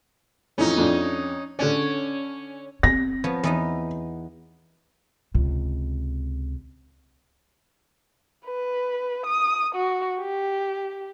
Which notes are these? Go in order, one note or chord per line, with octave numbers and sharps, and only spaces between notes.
F2 E3 C#4 D#4
F2 D4
D3 C#4 D4 D5
C4 A#6
F3 B3 C#5
E2 B3 D#4
C#2 C3
B4
D#6
F#4
G4